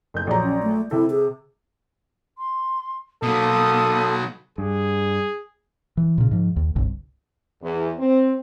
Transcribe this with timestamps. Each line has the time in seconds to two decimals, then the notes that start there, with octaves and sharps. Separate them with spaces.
0.14 F#1 G6
0.27 A#1 F#3 A#5
0.43 C#4
0.63 A3
0.91 C3 E4 A4
1.10 G#4
2.38 C6
3.23 B2 F#3 A#3 A4 D#6
4.58 G2 G#4
5.97 E3
6.18 A#2 C#3
6.31 G#2 F3
6.56 D#2
6.76 G1 C2
7.62 E2
7.99 C4